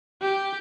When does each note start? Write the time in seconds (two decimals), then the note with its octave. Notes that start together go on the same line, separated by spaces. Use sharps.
0.22 G4